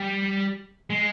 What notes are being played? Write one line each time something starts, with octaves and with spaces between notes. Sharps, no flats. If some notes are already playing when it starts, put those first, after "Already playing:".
Already playing: G3
G#3